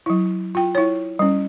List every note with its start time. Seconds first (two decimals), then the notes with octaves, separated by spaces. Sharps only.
0.06 F#3 E4
0.55 F4 G5
0.75 E4 C#5
1.19 G3 C#4